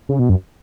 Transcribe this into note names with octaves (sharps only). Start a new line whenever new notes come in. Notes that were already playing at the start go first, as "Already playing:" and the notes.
C#3
B2
F#2